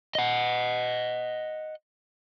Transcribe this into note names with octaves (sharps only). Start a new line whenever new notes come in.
D#5 F#5